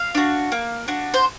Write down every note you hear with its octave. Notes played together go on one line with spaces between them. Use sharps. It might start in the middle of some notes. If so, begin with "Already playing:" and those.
Already playing: F5
D4 F#4
A#3
D4 F#4
C5